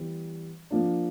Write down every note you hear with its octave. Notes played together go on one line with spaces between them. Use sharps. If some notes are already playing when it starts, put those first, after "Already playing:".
Already playing: E3 G3 B3
F3 A#3 D4